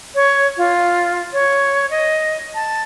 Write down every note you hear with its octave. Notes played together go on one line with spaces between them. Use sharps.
C#5
F4
C#5
D#5
A5